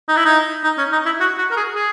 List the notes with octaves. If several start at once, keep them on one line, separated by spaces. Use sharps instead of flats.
D#4
E4
D#4
D#4
C#4
D#4
E4
F#4
F#4
A#4
G#4
G#4